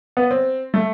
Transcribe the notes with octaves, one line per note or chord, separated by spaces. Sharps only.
B3
C4
A3